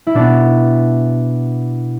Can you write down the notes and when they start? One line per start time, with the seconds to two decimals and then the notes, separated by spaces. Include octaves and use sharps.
0.07 E4
0.14 B2 B3 D4